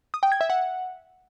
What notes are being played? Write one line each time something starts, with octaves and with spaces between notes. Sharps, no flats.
D#6
G5
G#6
E5
F#5